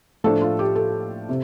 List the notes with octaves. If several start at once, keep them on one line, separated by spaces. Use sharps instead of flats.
A2 F3 A3 D4 A4
F4
G4
A4
C3